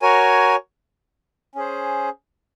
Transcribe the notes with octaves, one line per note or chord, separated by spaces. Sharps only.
F#4 A#4 C#5 G#5
C#4 G#4 C5